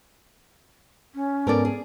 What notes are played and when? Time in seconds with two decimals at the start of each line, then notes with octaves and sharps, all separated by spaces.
1.14 C#4
1.47 G#2 B3 A4 A#4 D5
1.65 G#4